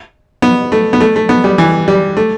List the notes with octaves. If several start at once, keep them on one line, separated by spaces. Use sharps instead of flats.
B3
A3
B3
A3
A3
B3
G3
E3
G3
A3